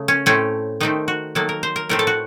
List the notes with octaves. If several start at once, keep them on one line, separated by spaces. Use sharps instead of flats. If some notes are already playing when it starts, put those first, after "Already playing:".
Already playing: C#3 A3
C#4
A2 A3 C4 C#4
D#3 A3 C4 D#4
F#4
D#3 F#3 A#3 A4
A#4
C5
A#4
A2 A3 C4 A#4
A4
F#4